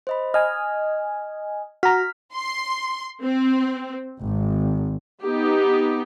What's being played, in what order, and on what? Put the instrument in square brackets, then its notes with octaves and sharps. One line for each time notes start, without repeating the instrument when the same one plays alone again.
[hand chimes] C5 D#5 B5
[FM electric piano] D#5 G#5 [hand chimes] F6
[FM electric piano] F#4 A#5 [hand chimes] F6 B6
[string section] C6
C4
G#1
[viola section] B3 D#4 G4